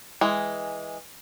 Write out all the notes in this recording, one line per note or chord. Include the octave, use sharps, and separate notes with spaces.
E3 G#3